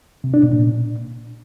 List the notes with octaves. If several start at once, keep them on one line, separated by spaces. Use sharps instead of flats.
C3
D4
B2
A#2